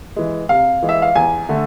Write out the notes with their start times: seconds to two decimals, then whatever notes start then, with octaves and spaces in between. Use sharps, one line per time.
0.16 E3 G#3
0.49 C3 F5
0.82 E3 G#3
0.89 E5
1.02 F5
1.15 E2 G#5
1.49 D3 A3